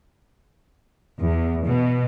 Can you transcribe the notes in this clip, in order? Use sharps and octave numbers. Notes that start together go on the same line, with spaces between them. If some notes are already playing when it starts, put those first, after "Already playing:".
E2
B2